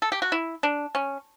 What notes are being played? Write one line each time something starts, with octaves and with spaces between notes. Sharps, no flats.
A4
G4
F#4
E4
D4
C#4